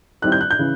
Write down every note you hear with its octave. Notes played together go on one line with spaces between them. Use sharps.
D#3 G3 C4 E4 F#6
G6
F#6
G6
C#3 E3